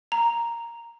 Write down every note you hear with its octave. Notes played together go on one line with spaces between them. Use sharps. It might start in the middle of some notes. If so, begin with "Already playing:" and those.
A#5